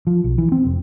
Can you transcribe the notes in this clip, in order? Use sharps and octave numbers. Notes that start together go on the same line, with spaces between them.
F3
B1
E3
C4
F1